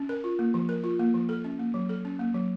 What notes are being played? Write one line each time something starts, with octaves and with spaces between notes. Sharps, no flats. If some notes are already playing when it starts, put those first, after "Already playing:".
Already playing: C#4
A#4
F4
A#3
F3
A#4
F4
A#3
F3
A4
C#4
A#3
F#3
A4
C#4
A#3
F#3